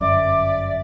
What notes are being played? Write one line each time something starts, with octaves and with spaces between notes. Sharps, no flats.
G1 F#2 D5 E5 D6